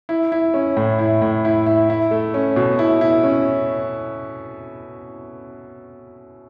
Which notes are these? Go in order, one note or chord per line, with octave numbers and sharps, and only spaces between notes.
E4
E4
C#4
A2
E4
A2
E4
E4
E4
A3
C#4
B2
E4
E4
C#4